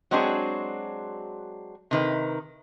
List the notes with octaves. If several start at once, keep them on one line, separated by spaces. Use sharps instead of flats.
F#3 G#3 C4 D4 F#4 G#4
C3 D#3 B4